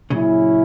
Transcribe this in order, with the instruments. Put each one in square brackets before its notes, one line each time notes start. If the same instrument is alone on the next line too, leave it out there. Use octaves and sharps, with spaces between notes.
[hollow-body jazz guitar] A#2 C#3 [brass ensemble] F#3 C#4 E4